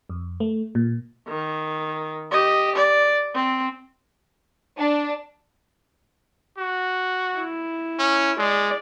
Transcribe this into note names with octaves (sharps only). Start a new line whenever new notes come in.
F2
A3
A#2
D#3
G4 D#5
D5
C4
D4
F#4
E4
C#4
G#3 D5